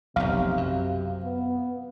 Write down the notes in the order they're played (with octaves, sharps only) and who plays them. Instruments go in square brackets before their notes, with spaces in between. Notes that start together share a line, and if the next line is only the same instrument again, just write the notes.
[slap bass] F1 B1 [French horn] C3 [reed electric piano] F5
[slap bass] F#2
[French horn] B3